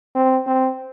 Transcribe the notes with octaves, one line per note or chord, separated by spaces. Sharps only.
C4
C4